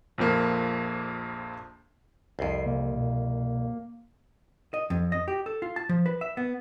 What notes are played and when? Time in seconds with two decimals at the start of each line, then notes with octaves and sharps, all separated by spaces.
0.18 A#1 F2 F3 A#3
2.39 C2 F2 C7
2.66 C3 A#3
2.96 B2
4.74 D#5
4.90 F2
5.12 D#5
5.28 G4
5.46 A4
5.62 F4
5.76 A5
5.89 F3
6.06 B4
6.21 E5
6.37 B3